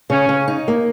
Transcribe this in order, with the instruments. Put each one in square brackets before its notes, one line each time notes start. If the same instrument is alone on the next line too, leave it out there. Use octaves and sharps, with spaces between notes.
[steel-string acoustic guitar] C#3 [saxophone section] C#4
[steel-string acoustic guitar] C#3
D#4
A#3